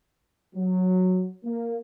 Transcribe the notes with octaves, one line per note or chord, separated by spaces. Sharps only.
F#3
A#3